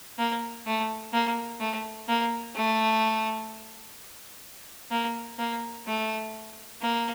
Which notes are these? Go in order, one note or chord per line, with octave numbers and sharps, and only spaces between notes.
A#3
A3
A#3
A3
A#3
A3
A#3
A#3
A3
A#3